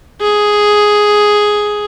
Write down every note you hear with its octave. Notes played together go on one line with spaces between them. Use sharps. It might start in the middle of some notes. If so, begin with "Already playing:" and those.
G#4